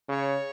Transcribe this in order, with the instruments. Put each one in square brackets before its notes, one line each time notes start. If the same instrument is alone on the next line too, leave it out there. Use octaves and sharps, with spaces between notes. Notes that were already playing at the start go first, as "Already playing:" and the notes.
[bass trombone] C#3 [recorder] C#5